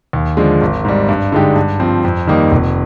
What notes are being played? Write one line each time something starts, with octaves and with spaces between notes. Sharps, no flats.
D#2
D3 F3 G#3
G#1
G#2 G3
G2
D3 G#3 D#4 G4
G2
F3 C4
F2
D#3 G3 A#3 D#4
F1